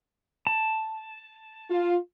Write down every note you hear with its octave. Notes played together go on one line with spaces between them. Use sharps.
A5
F4